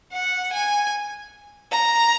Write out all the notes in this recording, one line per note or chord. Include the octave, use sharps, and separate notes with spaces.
F#5
G#5
A#5